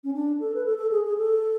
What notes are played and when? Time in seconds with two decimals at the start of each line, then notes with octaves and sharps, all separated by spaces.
0.04 C#4
0.14 D4
0.40 A4
0.54 B4
0.65 A4
0.78 A4
0.91 G#4
1.04 G#4
1.17 A4